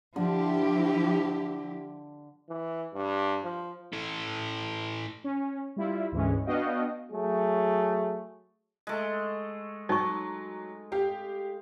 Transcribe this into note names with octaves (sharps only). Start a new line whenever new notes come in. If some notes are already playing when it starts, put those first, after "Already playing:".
D3 F3 E4 G4
E3
G2
F3
E3 A4
C#4
G3 E4 F4
D2 G#2 E3 G#3 C#4
B3 D4 F#4 D#5 F5 G5
F#3 A3 G#4
G#3 A3
F#3 D#4 C#6
G4 F5